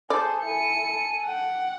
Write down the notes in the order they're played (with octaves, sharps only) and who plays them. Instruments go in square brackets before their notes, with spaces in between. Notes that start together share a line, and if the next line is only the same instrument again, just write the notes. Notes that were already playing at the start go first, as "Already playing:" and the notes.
[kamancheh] G#4 A4 [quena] C5 [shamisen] D5
[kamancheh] E4 A4 [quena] G#5 [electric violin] C#7
[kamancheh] A4
[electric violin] F#5 [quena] G5